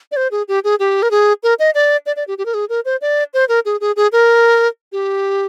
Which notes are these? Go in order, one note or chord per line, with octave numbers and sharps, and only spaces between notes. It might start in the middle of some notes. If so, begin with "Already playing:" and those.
D5
C5
G#4
G4
G#4
G4
A#4
G#4
A#4
D#5
D5
D5
D5
G4
G4
A#4
G#4
A#4
C5
D5
C5
A#4
G#4
G#4
G#4
A#4
G4